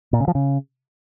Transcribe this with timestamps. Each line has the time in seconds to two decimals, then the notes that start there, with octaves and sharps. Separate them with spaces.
0.13 A#2
0.20 C#3
0.28 F3
0.35 C#3